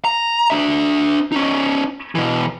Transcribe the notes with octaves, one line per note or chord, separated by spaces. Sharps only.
A#5
D4 E5
C#4 D#4
B2 E3